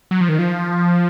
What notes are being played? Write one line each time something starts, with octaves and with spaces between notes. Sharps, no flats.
F#3
F3
D#3
F3